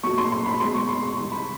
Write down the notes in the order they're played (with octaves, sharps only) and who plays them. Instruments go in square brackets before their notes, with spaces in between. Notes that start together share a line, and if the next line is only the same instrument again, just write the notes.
[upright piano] A#2 F#3 A3 C#6
C6
C6
B5
B2 G#3 C6
C#6
C6
C#6
C3 E3 G3 C6
B5